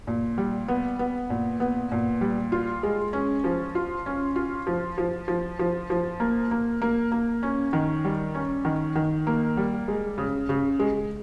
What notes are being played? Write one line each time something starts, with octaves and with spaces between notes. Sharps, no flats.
A#2
G3
B3
B3
A#2
B3
A#2
G3
F4
G#3
C#4
F3
F4
C#4
F4
F3
F3
F3
F3
F3
A#3
A#3
A#3
A#3
C#4
D#3
G3
C#4
D#3
D#3
A#3
G3
G#3
C#3
C#3
G#3